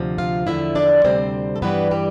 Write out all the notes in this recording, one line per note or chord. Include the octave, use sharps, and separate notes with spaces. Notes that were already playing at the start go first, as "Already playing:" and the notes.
Already playing: D2 C3 F3
F4 F5
E2 D3 F3 E4 E5
D4 D5
D2 C3 G3 C4 C5
A4
G2 E3 G3 B3 B4
G3 G4